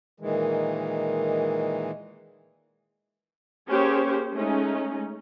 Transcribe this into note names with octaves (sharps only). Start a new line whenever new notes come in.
A#2 D#3 E3 G#3
A#3 C#4 G4 G#4 C5 C#5
G#3 A3 C#4 D#4